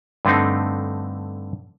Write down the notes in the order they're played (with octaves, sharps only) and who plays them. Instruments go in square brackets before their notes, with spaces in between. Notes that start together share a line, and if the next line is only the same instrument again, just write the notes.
[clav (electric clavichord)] G2 D3 A3 C4 D#4